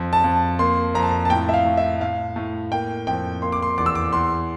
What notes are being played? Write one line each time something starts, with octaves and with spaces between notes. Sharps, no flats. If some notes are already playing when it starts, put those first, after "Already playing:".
Already playing: F2
A5
F2
A#3 C6
F2 A#5
A5
A#5
A5
A2 G5
E5
F5
A2
E5
A2 F5
A2
A#3 G5
F2 G5
A#3 C6
D6
C6
E2 D6
E6
D6
E2 C6